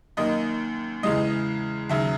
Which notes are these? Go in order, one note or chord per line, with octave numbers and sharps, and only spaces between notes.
F#2 D#3 A#3 D#5
E2 C#3 E3 G#3 D#5
D#2 C#3 F#3 E5